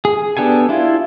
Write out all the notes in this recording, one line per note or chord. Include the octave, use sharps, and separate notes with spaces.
G#4
B3 D4 G4 A4 G#5
D4 E4 F4